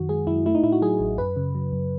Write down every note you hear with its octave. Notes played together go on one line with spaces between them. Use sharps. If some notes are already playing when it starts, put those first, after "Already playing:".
Already playing: F#2 D#3 F#4
G#3 G#4
F#2 E4
A3 E4
D#4
A2 E4
F#4
F#3 G#4
A1
F#2 B4
C#3
F#3
F#2